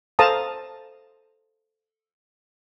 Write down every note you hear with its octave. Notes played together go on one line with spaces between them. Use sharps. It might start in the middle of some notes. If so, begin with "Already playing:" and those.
A4 C5 F5 A5 A#5 D#6